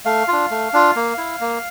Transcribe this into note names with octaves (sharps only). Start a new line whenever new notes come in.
A3 F5
D4 F4
A3
D4 F4
A#3
E4
A#3